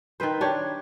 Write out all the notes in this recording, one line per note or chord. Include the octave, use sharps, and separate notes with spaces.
D#3 C4 B4 C5
D4 G4 C#5